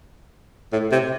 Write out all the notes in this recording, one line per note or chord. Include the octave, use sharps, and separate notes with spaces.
A2
C3